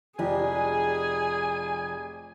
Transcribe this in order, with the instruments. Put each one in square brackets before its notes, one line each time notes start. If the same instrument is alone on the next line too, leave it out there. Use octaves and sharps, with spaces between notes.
[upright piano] F1 F3 G4 [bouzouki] G#3 D4 [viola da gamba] G#4 [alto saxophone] G#5